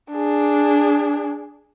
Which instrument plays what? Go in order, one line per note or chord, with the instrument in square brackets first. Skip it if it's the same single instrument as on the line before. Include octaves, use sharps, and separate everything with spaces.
[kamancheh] D4 G#4